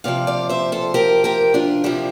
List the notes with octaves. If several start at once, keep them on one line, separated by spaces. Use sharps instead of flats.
C3 F3 D5 F5
D5 F5
C5 E5
A4 C5
G4 A#4
G4 A#4
D4 F4
C3 F3 E4 G4